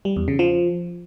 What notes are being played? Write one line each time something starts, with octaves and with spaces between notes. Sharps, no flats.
G3
E2
C#3
F3